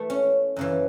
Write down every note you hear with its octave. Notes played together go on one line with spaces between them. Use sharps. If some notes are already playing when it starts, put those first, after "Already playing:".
Already playing: E3 A3
C#4
F#2 C#3 E3